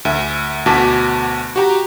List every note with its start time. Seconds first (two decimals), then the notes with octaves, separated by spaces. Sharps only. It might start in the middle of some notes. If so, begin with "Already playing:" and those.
0.05 D2 E5
0.66 D2 B2 F#4 A5 D6 B6
1.56 F#4 G4 A#5